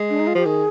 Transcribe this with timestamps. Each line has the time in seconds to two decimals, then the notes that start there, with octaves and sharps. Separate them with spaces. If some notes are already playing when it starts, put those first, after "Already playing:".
Already playing: G#3
0.10 D4
0.19 D#4
0.27 F4
0.35 F3 G4
0.45 D#3 G#4